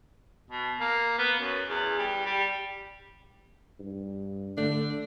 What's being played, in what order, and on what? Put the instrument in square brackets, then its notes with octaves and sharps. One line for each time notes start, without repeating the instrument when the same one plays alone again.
[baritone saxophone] B2
A#3
B3
F#2
E2
G3
G3
[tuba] G2
[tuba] D3 [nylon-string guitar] A3 [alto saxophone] D4